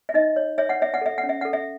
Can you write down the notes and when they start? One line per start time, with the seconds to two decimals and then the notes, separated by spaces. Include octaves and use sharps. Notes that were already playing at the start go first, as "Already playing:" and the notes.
0.09 E5
0.14 D#4 D#5
0.36 C#5
0.58 C#5 E5
0.69 F#5
0.80 C#5 E5
0.94 F#5
1.01 A4 E5
1.18 F#5
1.24 C#4
1.29 E5
1.41 A4 F#5
1.53 E5